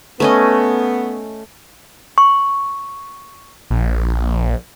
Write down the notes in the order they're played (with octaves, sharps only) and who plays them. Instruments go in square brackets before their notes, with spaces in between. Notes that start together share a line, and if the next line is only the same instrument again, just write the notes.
[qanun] A3 C#4 D#5 [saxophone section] B3
[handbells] C#6
[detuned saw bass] A#1